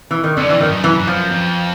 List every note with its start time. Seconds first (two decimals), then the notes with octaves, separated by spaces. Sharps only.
0.11 E3
0.24 D#3
0.37 F2 D3
0.50 E3
0.61 F2 D#3
0.68 F#2
0.84 E3
0.99 F#2
1.07 F3
1.30 F2